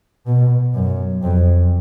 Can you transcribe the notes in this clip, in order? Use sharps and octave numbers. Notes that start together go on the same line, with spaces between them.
B2
F#2
F2